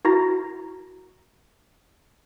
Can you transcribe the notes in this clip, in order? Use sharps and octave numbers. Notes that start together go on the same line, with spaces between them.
E4 F#4 A#4 A#5 A#6